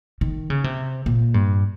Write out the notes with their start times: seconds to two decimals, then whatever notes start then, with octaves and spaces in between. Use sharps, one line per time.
0.21 D#3
0.50 C#3
0.64 C3
1.06 A#2
1.34 G2